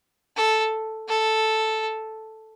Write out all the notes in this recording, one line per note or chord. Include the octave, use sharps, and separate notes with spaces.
A4
A4